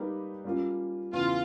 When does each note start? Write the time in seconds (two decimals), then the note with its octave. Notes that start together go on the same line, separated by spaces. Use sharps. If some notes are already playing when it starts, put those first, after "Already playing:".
Already playing: G3 A#3 D#4 G4 B4
0.45 G3 A#3 C#4 F4
1.13 E2 C#3 E3 F4